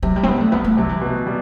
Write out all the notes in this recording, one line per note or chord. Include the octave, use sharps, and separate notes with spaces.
C3 F#3
G3
C4
G3 B3
A3
C2 B3
A3
C3 F#3
E3
B2
G3